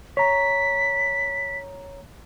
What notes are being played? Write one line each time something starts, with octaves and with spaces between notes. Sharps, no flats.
C#5 A#5 B6